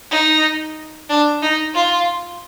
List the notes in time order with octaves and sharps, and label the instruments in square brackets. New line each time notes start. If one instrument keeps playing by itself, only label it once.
[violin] D#4
D4
D#4
F4